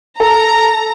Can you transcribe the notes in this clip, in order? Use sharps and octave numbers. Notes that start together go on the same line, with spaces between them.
A4 A#5